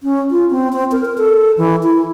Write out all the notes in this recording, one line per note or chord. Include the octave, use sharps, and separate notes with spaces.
C#4
F4
C4
C4
A#4
A#4
A4
E3
E4